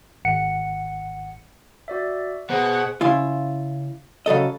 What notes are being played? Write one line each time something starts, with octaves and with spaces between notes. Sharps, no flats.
G#1 F#5 C#7
F#4 D5 E5
B2 G#4 C5 F#5
C#3 E4 F4
C#3 F#3 A4 D#5